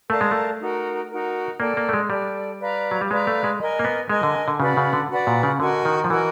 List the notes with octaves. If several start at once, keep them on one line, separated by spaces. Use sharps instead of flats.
A3 A#4 D5 F5 A5
G#3
A3
D#4 F#4 A#4
D#4 F#4 A#4
A#3 A4 D5 G5
A#3
A3
G#3
G3 A4 D5 G5
B4 D5 F5 A#5
F#3
G3
G#3 B4 D5 F5 A#5
A3
G#3
A#4 D#5 G#5
A#3
B3
G#3 A#4 D#5 G#5
D3
D3
C#3 F#4 B4 D5 F#5
C#3
D3
F#4 B4 D5 F#5
A#2
C#3
D3 F#4 A#4 D#5 G#5
D#3
F3
E3 F#4 A#4 D#5 G#5